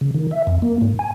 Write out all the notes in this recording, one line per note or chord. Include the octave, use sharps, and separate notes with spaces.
C#3
D#3
E5
F2
A#3
G#2
G#5